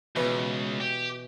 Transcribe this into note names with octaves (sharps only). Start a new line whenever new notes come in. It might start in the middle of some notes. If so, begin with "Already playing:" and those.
C#2 B2 E3 F#4
G4